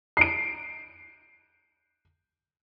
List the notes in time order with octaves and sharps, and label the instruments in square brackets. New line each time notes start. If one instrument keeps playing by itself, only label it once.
[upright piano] C7 D7